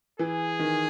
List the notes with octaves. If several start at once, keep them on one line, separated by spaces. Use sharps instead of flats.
E3 G#4
D#3